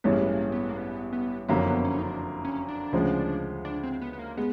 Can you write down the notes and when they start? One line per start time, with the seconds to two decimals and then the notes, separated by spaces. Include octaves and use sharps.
0.04 A1 G2 E3 G#3 B3 C#4
0.13 A#3
0.20 B3
0.29 A#3
0.52 B3
0.69 A#3
0.77 B3
1.13 B3
1.48 F#1 F2 D3 F#3 A#3 B3
1.67 B3
1.85 C#4
1.98 D#4
2.03 D4
2.45 C#4
2.69 D4
2.92 D2 C#3 F3 G#3
3.65 D4
3.83 C4
4.01 B3
4.13 B3
4.19 A#3
4.37 G#3 B3